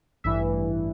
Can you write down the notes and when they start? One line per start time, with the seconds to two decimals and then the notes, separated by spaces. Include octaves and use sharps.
0.24 A1 G2 E3 E5